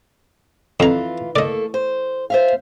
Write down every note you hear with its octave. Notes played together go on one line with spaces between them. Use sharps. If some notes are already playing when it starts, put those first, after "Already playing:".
F2 E3 F4 A#5
A3 A#3 A4 D5 D#5
C5
C5 E5 F5